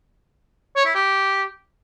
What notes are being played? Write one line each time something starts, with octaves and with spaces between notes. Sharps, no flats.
C#5
E4
G4